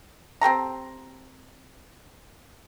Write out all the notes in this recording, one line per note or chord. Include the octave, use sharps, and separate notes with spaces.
C4 G4 A4 A#5